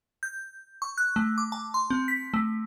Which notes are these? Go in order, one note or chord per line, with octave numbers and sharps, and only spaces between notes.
G6
C#6
F#6
A3
D6
A5
C6
C4
B6
A3